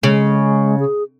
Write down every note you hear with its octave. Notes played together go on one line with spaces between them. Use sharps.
C#3 G#3
G#4